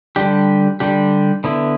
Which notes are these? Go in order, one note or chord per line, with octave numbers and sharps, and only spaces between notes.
D3 G3 D4 G4
D3 G3 D4 G4
D3 B3 E4